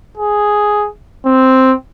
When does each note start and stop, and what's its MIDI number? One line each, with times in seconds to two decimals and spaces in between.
0.18 0.88 68
1.26 1.73 60